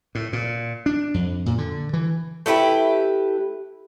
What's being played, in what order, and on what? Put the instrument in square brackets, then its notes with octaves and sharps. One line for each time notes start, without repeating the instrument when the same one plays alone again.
[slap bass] A2
A#2
D4
F2
A#2
D3
E3
[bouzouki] A3 E4 G4 B4